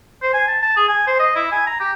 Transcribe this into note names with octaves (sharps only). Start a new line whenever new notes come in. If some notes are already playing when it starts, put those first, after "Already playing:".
C5
G#5
A5
A5
G#4
G#5
C5
D#5
E4
G#5
A#5
G4